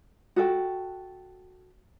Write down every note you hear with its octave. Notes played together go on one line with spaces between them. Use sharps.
F#4 A4 G5